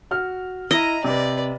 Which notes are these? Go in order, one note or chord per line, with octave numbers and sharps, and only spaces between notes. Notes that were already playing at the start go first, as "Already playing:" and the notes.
F#4 F6
E4 D#5 A#5
C3 B4 D5